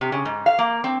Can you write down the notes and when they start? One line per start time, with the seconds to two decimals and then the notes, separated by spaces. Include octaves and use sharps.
0.01 C3
0.12 C#3
0.25 G#2
0.46 F5
0.59 A#3
0.84 C4